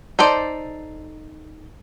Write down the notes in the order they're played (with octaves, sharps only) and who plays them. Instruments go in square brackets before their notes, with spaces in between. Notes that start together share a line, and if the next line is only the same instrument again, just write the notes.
[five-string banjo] D#4 A4 C5 D5